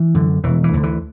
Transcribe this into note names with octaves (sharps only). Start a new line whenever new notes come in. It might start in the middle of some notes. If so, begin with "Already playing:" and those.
Already playing: E3
F#2 D3
E1 E3
E3
D2 D3
E3